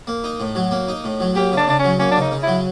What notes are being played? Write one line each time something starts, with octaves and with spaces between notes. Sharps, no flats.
A#3
D#4
A2
F#3
A#3
D#4
A2
F#3
A#3 G4
C#3 D4
C#3 D4
C#4
F#3
A#3 C#4
D4
C#3 D#4
C#3
F#3 E4